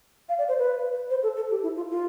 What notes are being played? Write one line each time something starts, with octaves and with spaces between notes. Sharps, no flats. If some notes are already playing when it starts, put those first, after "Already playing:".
F5
D5
C5
B4
C5
A4
A4
G4
E4
F4
F4